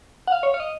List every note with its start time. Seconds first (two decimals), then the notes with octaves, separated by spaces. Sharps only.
0.27 F#5
0.32 F5
0.43 C#5
0.54 F5
0.60 D#5